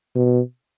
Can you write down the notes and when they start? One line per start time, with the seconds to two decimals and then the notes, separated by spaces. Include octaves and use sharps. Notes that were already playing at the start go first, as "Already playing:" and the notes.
0.16 B2